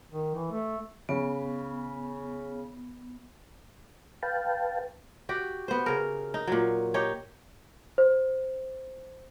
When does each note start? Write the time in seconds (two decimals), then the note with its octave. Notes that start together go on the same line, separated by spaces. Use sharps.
0.12 D#3
0.35 E3
0.52 A3
1.09 C#3 B3
4.23 B4 F5 G5 A5
5.29 F#4 G4
5.68 B3 C5
5.86 C#3 A#4
6.34 D#4
6.47 A#2 F#3
6.94 D#4 G4 C#5
7.98 C5